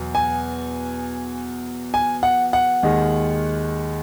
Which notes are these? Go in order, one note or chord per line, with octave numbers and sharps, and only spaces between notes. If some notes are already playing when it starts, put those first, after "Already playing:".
Already playing: E2 B2 F#3
G#5
G#5
F#5
F#5
D#2 D#3 G#3